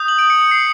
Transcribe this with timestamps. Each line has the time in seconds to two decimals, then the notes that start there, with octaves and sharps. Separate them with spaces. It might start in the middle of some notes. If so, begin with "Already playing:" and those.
Already playing: D#6 G6
0.08 F#7
0.19 D7
0.30 C#7
0.41 C#7
0.51 C7